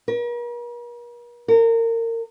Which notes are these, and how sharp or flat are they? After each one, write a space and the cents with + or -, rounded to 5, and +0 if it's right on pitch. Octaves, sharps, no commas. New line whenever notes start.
A#4 +45
A#4 -30